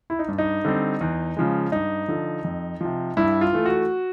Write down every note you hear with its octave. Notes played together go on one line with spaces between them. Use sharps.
E4
D#4
G2
D#4
D3 G3 C4
E2
C#3 F3 G#3
G2 D#4
D3 F3
F2
C3 F3
G2 E4
F4
E3 A3
F#4